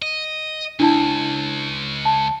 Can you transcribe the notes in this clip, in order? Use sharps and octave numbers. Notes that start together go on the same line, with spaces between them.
D#5
C#2 D4 E4 A5
A5